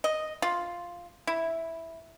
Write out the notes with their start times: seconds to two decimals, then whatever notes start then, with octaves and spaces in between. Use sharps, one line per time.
0.04 D#5
0.42 F4
1.27 E4